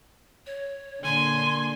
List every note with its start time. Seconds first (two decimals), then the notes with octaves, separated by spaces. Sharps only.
0.47 C#5
1.04 A#2 D3 D4 G#5 C6